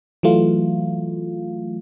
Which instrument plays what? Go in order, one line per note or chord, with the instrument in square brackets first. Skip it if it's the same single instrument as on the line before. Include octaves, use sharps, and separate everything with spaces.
[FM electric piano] E3 F#3 A3 F4